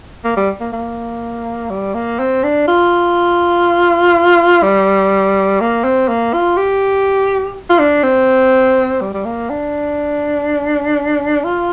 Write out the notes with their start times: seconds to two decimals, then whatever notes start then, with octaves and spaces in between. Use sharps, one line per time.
0.24 A#3
0.37 G3
0.60 A#3
0.73 A#3
1.70 G3
1.94 A#3
2.19 C4
2.44 D4
2.67 F4
4.63 G3
5.61 A#3
5.84 C4
6.08 A#3
6.33 F4
6.57 G4
7.70 F4
7.79 D4
8.03 C4
9.01 G3
9.14 G3
9.25 A#3
9.50 D4
11.44 F4